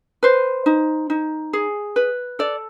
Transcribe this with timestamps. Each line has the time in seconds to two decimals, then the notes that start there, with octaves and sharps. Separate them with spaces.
0.23 B4 C5
0.66 D#4
1.10 D#4
1.53 G#4
1.96 B4
2.39 A4 D5